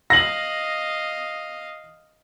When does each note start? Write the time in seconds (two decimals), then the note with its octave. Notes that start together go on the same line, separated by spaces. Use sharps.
0.10 D#5 F5 A#6 F#7